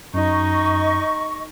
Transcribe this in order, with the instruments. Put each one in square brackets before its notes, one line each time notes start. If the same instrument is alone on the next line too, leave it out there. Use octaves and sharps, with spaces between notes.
[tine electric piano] F#2 [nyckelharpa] D#4 [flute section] D#5 C#6